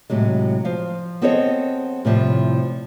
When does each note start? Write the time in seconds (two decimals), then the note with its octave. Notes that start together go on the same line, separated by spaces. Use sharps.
0.10 A2 C3 F#3 G#3
0.65 F3 F5
1.22 B3 C4 G#4 A4 C#5 D#5
2.05 A2 C3 F3 G3